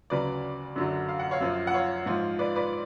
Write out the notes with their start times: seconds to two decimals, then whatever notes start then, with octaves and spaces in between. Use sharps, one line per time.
0.10 D2 C#3 F#3 B4 D5
0.76 F#2 D3 F#3
1.08 F5
1.19 F#5
1.31 C#5 F5
1.41 F#2 F3
1.67 F#5
1.74 C#5 F5
2.06 G#2 F3
2.39 B4 D5
2.56 B4 D5